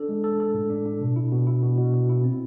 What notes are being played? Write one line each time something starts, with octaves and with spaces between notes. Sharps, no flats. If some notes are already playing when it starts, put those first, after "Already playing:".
Already playing: D4 A4
G#3
A4
A4
A2
D4
D4
B2
E4
B2
E4
B2
B2
B2
E4
C4